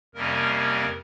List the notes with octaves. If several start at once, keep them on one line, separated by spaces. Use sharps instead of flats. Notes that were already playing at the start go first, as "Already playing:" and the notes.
F2 C3 G3 A#3 C#4 A#4